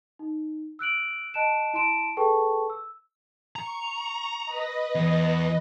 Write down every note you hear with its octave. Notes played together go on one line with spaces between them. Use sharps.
D#4
E6 F#6 D7 F#7
D#5 A5 F#6 D7 E7
E4 A5 C6 D7 E7
G#4 A4 B4 G5 A5 C#6
E6
A#5 C#6
B4 D#5 A#6
E2